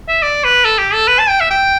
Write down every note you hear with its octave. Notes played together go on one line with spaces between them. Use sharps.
E5
D5
B4
A4
G4
A4
B4
A5
G5
E5
G5